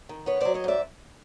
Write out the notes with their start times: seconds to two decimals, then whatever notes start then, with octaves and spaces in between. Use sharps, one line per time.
0.09 D#3
0.26 B3 B4 C#5
0.40 F#3 C5 D5
0.54 C#5 D#5
0.64 G#2 D5 E5